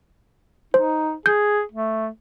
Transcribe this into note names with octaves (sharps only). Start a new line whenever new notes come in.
D#4 C5
G#4 G6
A3